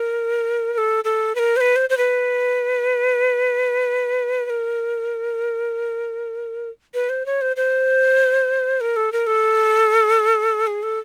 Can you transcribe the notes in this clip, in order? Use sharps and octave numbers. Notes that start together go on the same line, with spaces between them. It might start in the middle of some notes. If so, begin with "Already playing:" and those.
Already playing: A#4
A#4
A4
A4
B4
A#4
C5
B4
C5
C5
B4
B4
A#4
B4
C5
C#5
C5
C5
A#4
A4
A#4
A4
G#4
A4